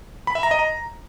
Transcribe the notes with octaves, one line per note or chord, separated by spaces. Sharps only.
B5
E5
A#5
D#5
A#5